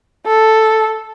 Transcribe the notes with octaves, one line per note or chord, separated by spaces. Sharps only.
A4